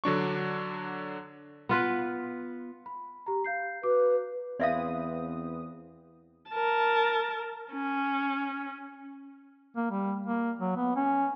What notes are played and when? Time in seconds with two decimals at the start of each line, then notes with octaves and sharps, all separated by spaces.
0.04 D3 F#3 D4 C#6
1.69 B3 F4 B4
2.86 B5
3.26 G4 A#5
3.44 F5 G6 C7
3.83 F#4 B4 D6
4.60 E2 C4 B4 D5 E5 F5 D#6
6.50 A#4 A5
7.71 C#4
9.76 A#3
9.91 G3
10.27 A#3
10.60 F#3
10.76 B3
10.96 C#4